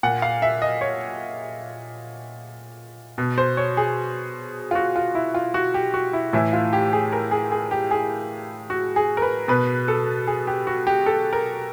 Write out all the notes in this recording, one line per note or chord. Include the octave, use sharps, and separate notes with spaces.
A#2 F#5
F5
E5
D#5
C#5
B2
C5
C#5
G#4
F4
F#4
F4
E4
F4
F#4
G4
F#4
E4
A2 E3 E4
F4
G4
G#4
A#4
G#4
G#4
G4
G#4
F#4
G#4
A#4
B4
B2 B4
A4
G#4
G4
F#4
G4
A4
A#4